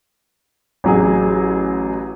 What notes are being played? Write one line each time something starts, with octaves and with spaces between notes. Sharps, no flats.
A1 F#3 G#4